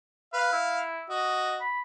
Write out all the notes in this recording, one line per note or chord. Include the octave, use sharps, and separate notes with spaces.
B4 F5
E4
F#4 D#5
B5